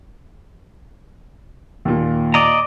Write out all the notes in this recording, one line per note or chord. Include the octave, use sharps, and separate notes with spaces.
D#2 A#2
D5 D#5 A#5